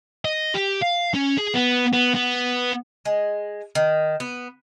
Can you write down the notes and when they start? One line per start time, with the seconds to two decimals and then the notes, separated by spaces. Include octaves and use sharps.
0.25 D#5
0.54 G4
0.82 F5
1.15 C#4
1.38 G#4
1.55 B3
1.93 B3
2.15 B3
3.05 G#3
3.75 D#3
4.20 B3